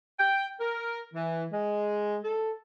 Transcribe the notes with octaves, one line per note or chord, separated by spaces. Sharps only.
G5
A#4
E3
G#3
A4